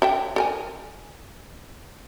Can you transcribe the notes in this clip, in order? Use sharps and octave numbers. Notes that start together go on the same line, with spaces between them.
A4 E5 G5
A4 A#4 G#5